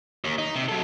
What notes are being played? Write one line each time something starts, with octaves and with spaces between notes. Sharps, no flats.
D#2
D#4
C3
F#3 A4